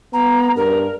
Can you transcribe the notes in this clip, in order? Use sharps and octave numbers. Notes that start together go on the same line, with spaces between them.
B3 A#5
G2 A#4